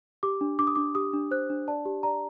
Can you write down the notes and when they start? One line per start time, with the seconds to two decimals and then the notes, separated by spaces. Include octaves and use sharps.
0.23 G4 D6
0.41 D4
0.59 D4 D6
0.67 D#6
0.75 D4 D6
0.95 G4 D#6
1.13 D4
1.31 C5 F#6
1.50 D4
1.68 D5 A5
1.85 G4
2.03 D5 A#5